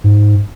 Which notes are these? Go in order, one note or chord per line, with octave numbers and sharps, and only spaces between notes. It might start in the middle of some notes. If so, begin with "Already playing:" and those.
G#2